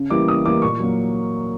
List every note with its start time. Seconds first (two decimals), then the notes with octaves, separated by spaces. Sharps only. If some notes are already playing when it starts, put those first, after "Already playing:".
Already playing: C#3
0.10 E3 G3 A#3 D6
0.28 C#3 D#6
0.45 E3 G3 A#3 D6
0.62 A#2 C#6
0.80 F#3 A#3